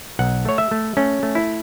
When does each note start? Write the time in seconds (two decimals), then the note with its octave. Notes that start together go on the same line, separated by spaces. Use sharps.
0.19 B1 F#5
0.45 A3 C#5
0.58 E5
0.71 A3
0.97 A3 C#4
1.23 A3
1.35 E4